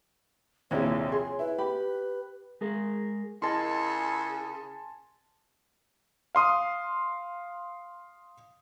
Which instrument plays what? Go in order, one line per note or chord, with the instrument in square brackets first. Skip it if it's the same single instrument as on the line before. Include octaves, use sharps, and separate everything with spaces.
[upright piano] F1 A#1 D#2 [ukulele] E4 G#4 [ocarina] C#5
[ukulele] G#4 [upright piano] C6
[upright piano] E4 [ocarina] B4
[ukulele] G4 [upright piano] B5
[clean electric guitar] G#3 G#4 A#4
[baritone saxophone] C#3 [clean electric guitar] E4 A#4 D#5 [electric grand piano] G#5 A5 C6
[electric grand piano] F5 C6 D#6